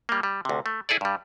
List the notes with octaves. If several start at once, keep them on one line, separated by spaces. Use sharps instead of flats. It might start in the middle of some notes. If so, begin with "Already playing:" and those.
G3 A#3
G3
D2 C3
A3
E4 G#4 A4 D5
G2 G3